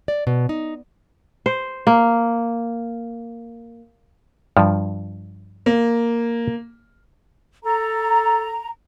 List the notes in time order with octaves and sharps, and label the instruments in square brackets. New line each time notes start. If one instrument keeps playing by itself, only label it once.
[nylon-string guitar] D5
B2
D#4
[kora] C5
A#3
[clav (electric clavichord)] G2 F3
[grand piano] A#3
[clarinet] A4 [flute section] A#5